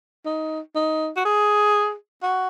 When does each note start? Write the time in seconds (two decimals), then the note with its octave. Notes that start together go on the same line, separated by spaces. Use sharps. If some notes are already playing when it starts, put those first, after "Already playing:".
0.26 D#4
0.75 D#4
1.16 F#4
1.25 G#4
2.23 F#4